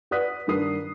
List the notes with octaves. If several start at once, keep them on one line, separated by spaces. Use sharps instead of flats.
B4 D5 F#5 D#6 F#6 B6
G2 D#3 D4 A#4 D#6 C7